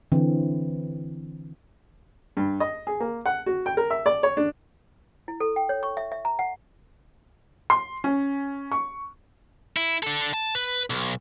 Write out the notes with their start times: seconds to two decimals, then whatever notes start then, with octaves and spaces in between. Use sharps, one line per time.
0.12 D3 E3 C4
2.37 G2
2.60 D#5
2.87 G#4
3.00 A#3
3.26 F#5
3.46 F#4
3.66 G5
3.77 A#4
3.90 E5
4.06 D5
4.23 C#5
4.37 D4
5.28 E4
5.40 A4
5.56 G5
5.69 C#5
5.83 C#6
5.97 E5
6.12 E5
6.25 A#5
6.39 F#5
7.70 C6
8.04 C#4
8.72 C#6
9.77 E4
10.03 D4 A4
10.34 A5
10.55 B4
10.90 B1